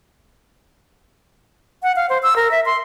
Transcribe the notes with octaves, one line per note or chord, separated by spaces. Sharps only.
F#5
F5
C5
E6
A#4
E5
C6